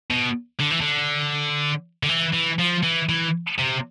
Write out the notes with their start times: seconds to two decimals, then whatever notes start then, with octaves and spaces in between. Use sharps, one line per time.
0.11 B2
0.60 D3
0.71 E3
0.81 D3
2.03 D3
2.09 E3
2.34 E3
2.59 F3
2.83 E3
3.09 E3
3.58 C3